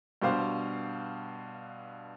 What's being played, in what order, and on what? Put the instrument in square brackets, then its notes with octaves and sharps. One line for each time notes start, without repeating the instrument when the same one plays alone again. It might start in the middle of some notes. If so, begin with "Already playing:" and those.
[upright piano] G2 B2 G4 C5 F5